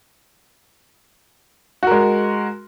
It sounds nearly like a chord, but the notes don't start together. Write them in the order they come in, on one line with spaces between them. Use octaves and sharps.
F#4 A#4 G#3